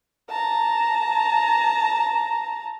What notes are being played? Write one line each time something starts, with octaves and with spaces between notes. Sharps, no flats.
A5 A#5